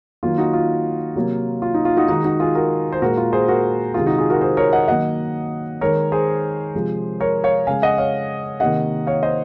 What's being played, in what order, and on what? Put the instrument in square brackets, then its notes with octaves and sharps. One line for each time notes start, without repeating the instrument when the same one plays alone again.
[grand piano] D#3 F#3 A#3 F4
D#4 F#4
F4
C3 F#3 A#3
F4
D#4
F4
D#4 F#4
D#3 G#3 D#4 F#4
D#4 F#4
F4 G#4
F#4 A#4
C5
A#2 G#3 F#4 A#4
F4
G#4 C5
F#4 A#4
C3 D#3 G#3 F4 G#4
D#4 F#4
F4 G#4
F#4 A#4
G#4 C5
A#4 C#5
D#5 F#5
D#3 F#3 A#3 D#5 F#5
D#3 G#3 A#4 C#5
G#4 C5
C3 F3 G#3
A#4 C#5
C#5 F5
C#3 G#3 F5 G#5
D#5 F#5
C#5 F5
C3 D#3 A#3 D#5 F#5
C#5 F5
C5 D#5